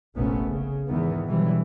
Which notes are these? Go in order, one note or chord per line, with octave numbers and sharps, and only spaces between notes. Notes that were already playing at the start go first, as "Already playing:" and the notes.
F1 A#1 A#2 A3 B3 C#4
C#3
E2 G#2 D#3 E3 B3
B2 D3 E3 F#3 G3